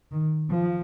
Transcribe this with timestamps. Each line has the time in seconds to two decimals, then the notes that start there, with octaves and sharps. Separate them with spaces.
0.12 D#3
0.50 F3